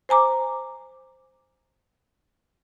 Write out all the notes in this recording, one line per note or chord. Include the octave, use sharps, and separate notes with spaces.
C5 G#5 A#5 D6